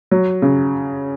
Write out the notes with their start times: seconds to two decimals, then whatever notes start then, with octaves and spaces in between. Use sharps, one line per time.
0.11 F#3
0.42 C#3